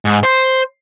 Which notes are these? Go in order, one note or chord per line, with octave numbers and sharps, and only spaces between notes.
G#2
C5